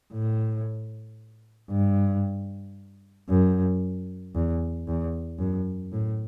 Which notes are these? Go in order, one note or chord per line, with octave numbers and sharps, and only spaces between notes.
A2
G2
F#2
E2
E2
F#2
A2